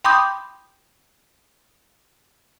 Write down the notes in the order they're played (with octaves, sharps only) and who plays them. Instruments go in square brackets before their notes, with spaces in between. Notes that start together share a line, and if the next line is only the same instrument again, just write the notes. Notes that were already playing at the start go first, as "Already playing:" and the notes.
[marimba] G5 B5 C6 D6 D#6 G6